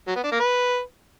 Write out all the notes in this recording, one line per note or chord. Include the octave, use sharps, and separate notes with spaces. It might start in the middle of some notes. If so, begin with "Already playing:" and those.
F#3
B3
D4
A#3
B4